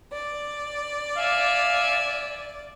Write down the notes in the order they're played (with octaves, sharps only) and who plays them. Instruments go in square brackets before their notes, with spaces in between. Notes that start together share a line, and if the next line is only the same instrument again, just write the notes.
[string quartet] D5
[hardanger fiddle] E5 G#5 [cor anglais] F5